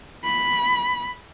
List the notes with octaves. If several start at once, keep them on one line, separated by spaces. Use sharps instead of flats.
B5